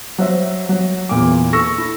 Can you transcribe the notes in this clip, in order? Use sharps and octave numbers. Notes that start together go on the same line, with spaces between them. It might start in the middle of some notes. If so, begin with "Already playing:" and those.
F#3 C5 E5
F#3
E2 A#2 D6
A4 C#6 E6 A#6
E4